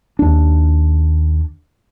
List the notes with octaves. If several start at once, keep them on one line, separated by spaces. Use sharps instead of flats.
D#2 D4